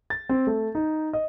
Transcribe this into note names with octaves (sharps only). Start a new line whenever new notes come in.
A6
C4
A3
D#4
D#5